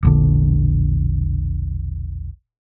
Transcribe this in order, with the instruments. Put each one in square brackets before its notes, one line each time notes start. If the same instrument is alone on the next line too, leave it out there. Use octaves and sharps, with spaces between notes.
[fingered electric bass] E1 A#1 D3